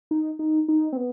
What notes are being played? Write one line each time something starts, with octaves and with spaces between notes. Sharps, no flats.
D#4
D#4
D#4
C4
B3